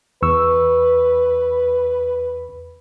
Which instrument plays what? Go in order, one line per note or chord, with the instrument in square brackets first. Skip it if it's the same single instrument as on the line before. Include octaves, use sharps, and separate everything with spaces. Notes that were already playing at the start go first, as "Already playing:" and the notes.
[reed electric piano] E2 C#6 E6 [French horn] B4